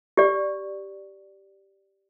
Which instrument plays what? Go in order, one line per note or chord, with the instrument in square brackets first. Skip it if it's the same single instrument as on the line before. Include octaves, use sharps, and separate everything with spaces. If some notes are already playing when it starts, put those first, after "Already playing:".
[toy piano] G4 D5